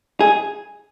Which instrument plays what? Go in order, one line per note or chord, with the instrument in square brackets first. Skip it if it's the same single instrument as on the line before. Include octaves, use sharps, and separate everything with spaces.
[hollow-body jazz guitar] G#4